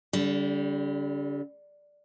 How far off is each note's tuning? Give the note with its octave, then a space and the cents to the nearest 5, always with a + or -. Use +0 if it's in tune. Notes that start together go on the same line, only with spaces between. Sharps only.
D3 -40 G3 +0